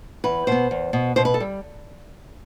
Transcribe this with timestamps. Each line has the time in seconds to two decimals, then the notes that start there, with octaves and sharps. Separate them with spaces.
0.24 E2 B4
0.47 B2 B3 C5
0.71 E2
0.93 B2 B3
1.16 B2 C5
1.25 B4
1.34 A4
1.40 G3